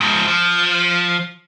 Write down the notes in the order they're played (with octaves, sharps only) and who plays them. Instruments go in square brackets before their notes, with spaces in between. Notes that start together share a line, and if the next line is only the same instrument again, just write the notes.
[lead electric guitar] G#2 F3
F3